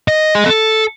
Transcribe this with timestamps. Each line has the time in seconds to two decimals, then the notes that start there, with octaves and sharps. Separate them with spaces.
0.08 D#5
0.35 G#4
0.46 A4